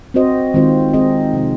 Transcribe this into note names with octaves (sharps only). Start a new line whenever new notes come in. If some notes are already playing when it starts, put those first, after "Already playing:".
C4 F#4 C5 D#5
D#3 G#3 C4 F4 C5
G#3 C4 D#4 G#4 D#5
C3 F3 C4